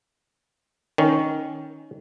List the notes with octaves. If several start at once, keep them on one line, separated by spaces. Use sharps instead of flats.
D#3 C#4